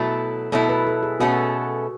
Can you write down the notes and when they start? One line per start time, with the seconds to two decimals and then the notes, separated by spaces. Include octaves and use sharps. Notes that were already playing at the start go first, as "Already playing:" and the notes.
Already playing: B2 F#3 A3 E4
0.52 B2 F#3 A3 E4 A4
0.69 B4
0.87 A4
1.03 G#4
1.20 B2 A3 C#4 E4 F#4 A4